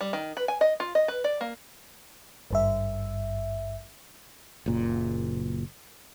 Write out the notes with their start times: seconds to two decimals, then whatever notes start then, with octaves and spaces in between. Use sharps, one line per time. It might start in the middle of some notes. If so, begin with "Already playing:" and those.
0.01 G3
0.13 D#3
0.37 B4
0.48 G#5
0.61 D#5
0.80 F4
0.95 D#5
1.08 B4
1.24 D5
1.41 A#3
2.51 G#1 G2 E5
4.66 F#1 A#2